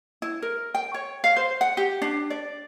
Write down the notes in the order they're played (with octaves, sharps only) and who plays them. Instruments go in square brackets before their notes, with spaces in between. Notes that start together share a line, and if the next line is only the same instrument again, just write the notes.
[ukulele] E4
A#4
G5
C#5
F5
C5
F#5
G4
D4
D5